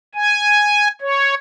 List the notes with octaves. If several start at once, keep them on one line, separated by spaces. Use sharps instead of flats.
G#5
C#5